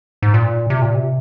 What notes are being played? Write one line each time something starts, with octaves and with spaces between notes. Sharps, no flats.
G#2
A#2
C3
A#2
C3